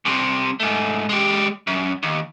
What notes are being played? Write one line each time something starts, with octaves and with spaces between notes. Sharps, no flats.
C2 C3
G#2 A3
G#3 G4
F#2
D#2